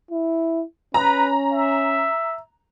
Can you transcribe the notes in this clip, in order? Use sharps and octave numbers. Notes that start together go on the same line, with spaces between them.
E4
C#4 B4 A#5
E5